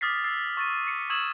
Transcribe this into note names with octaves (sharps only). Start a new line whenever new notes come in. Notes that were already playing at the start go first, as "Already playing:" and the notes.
D6 D#6 F6 A6 B6 C7
E6 A6 C7
C#6 A6 D#7
C7 C#7
C#6 D#6 E6 G#6 E7 F#7